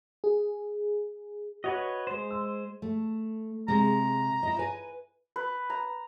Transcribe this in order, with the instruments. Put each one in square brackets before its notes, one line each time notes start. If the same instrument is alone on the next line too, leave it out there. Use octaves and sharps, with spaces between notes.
[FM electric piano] G#4
[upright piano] F#4 [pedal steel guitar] B4 C#5 D#5
[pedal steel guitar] G#3 C5
[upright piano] E6
[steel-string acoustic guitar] A3
[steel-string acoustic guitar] C3 G#3 [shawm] A#5
[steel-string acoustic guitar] E4 D#5
B4 G#5
[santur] B4
A#5